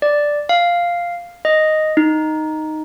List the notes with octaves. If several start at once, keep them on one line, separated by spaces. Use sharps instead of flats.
D5
F5
D#5
D#4